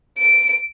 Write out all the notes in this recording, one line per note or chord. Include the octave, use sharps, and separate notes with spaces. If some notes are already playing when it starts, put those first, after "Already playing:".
D7